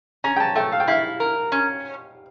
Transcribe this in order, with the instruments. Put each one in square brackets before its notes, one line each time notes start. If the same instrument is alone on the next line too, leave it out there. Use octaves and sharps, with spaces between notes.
[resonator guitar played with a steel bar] C#4 [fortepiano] A#5
[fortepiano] G5
A5
[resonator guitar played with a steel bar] A3 [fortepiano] G5
[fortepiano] F5
G5
[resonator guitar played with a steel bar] E4 [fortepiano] F5
[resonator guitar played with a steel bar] A#4
C#4